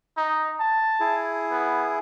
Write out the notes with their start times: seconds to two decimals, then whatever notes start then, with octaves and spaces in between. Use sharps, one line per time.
0.17 D#4
0.60 A5
1.00 E4 G#4
1.51 B3